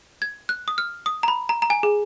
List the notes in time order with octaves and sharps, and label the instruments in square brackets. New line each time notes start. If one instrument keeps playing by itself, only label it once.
[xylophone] G#6
F#6
D#6
F6
D#6
A#5
B5
A#5
A#5
G#5
G#4